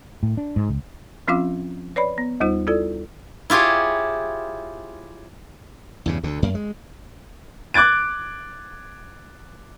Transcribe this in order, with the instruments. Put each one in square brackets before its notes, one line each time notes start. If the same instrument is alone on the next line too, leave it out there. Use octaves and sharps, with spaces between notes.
[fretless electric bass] A2
D4
G#2
C#2
[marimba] F3 C4 C#4 F4 F5 D6
B4 C#5 D5 B5
B3
D#2 G3 D#4 F4 C5
E4 F4 A4 D5
[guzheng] E4 F4 G4 G#4 C#5
[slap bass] E2 G2 C#3
D2 D3
F#2 A#3
G#3
[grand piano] D6 F#6 G#6 A6 D7